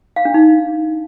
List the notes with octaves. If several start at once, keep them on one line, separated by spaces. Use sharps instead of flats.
F5
D4
D#4